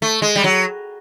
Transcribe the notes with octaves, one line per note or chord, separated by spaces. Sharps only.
A3
G#3
G3
F#3